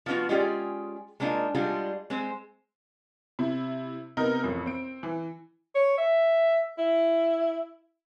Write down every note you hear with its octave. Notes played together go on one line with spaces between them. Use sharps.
F3 B3 C#4 F4 F#4
G#3 C#4 F4 G4 G#4 D5
G#3 A#3 D4 D#4 F4
G3 G#3 D4 F4 F#4 G#4
G#3 C4 C5
C3 E4
C3 B3 D#4 A#4
A1 F2
C4 D7
E3
C#5
E5
E4